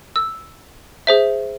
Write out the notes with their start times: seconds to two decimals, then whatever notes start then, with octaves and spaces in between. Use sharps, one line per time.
0.16 E6
1.07 G#4 C5 E5